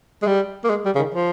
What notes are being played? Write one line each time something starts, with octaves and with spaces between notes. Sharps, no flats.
G#3
G3
A#3
G#3
G3
C#3
D#3
F3